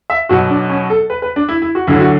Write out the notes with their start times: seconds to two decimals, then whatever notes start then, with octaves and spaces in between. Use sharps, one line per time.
0.10 E5
0.29 B1 B2 F#3 F#4
0.50 D4
0.70 C#4
0.90 A4
1.10 B4
1.22 B4
1.36 D4
1.49 E4
1.62 E4
1.75 F#4
1.87 D2 D3 F#3 E4
2.00 F#4